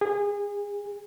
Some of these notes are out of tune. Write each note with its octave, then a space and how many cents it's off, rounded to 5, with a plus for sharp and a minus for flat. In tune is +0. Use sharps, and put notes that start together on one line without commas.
G#4 -30